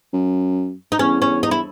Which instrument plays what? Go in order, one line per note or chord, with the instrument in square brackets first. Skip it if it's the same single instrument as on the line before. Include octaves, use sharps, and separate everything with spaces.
[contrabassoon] F#2
[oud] D#4
[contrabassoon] E2 [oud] C#4
[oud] C#4
D#4
E4